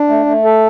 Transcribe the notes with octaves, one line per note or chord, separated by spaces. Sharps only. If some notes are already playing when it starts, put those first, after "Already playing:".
Already playing: D4
A3
A3
A4